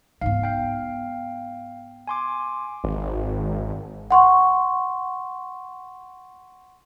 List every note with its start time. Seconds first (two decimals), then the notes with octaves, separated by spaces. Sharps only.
0.21 G#2 B3 F5
0.43 F5 G5
2.07 G#5 C6 D6
2.84 G#1
4.11 F#5 C6 C#6